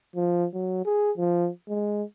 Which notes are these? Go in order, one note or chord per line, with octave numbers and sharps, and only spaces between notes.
F3
F#3
G#4
F3
G#3